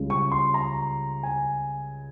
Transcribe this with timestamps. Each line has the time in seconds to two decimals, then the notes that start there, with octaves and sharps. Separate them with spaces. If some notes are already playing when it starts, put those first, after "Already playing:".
Already playing: C#2 C#3 G3
0.10 C#6
0.32 C6
0.54 A#5
1.23 G#5